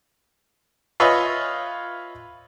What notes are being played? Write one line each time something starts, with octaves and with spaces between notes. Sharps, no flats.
F4 B4 C#5 D#5 E5 G#5